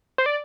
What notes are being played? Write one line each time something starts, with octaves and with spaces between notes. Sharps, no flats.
C5
D5